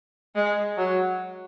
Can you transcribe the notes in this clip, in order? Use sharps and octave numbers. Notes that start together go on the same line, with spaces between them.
G#3
F#3